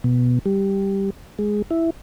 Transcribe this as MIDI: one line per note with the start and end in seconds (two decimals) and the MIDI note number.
0.04 0.39 47
0.46 1.10 55
1.39 1.62 56
1.71 1.90 64